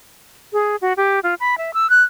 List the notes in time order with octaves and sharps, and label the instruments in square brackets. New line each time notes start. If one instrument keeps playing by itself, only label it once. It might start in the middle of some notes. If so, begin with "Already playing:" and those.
[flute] G#4
F#4
G4
F4
B5
E5
E6
F#6